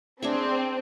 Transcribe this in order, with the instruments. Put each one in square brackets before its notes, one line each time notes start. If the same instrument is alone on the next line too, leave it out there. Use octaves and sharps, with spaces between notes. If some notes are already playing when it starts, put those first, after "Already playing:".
[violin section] C4 [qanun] D4 G#4 E5